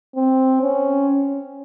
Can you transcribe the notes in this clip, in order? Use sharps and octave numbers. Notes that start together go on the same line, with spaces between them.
C4
C#4